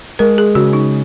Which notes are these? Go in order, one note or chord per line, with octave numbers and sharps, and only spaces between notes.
G#3 A#4
G#4
C#3 F#4
D#4